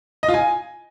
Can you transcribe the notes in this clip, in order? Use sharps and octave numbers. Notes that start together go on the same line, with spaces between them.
D#5
F4
G#5